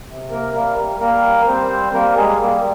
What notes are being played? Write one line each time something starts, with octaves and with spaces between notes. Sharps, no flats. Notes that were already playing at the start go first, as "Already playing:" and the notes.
C3
A#3 A#4
G3 A#3 A#4
G3 A#3 A#4
G3 C4 C5
G3 A#3 A#4
G#3 G#4
G3 A#3